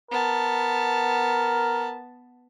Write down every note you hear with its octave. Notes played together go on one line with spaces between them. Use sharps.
B3 A#4 A5